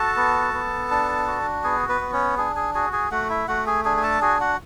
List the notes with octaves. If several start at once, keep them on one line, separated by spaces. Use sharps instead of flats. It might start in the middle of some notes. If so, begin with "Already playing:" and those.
Already playing: F#4 A4 A5
B3
B3
D4
F#4
B3 G#4 G#5
B3 B4
B3
C#4 C#5
D4 G#4 G#5
G#4 G#5
F#4 G#4 G#5
G#4 G#5
A3 F#4 F#5
E4 E5
A3 F#4 F#5
G#4 G#5
D4 G#4 G#5
G#5
A4 A5
F#4 G#4 G#5
F#4 F#5